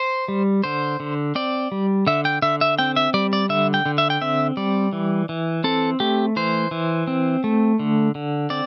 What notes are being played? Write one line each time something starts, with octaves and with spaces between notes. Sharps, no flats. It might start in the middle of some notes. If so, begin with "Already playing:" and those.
Already playing: C5
G3
D3 C5
D3
C4 D5
G3
D3 E5
G5
D3 E5
E5
C4 G5
E5
G3 D5
D5
D3 E5
G5
D3
E5
G5
C4 E5
G3 D5
E3
E3
C4 A4
A3 G4
E3 C5
E3
C4
A3
D3
D3
C4 D5